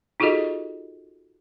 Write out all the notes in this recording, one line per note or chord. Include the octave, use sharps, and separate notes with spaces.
D#4 F4 F#4 G#4 A4 D#5